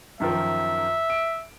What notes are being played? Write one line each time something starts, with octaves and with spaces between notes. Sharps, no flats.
F#2 D#3 F3 E5
D7